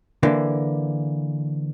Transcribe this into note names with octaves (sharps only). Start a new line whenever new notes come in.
D3 E3 A#3